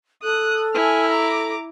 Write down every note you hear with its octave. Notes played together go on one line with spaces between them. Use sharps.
A4 D#6 F#6
E4 G#5 F6
A#5 D6